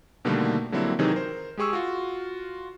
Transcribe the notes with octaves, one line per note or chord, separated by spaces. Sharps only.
B2 D3 D#3 G3 A3 A#3
D3 F#3 G3 A#3 C4 E4
C3 D#3 E3 F#3 D#4 G#4
A#4 C5
G#3 G4 G#4 C#6 E6
F4 F#4